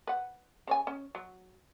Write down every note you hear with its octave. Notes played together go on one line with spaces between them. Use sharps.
B4 F#5
C#3 C#5 G#5
C#4
F#3